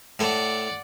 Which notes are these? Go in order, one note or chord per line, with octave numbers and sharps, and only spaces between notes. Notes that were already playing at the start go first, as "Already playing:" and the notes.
A2 A4 D5 F#5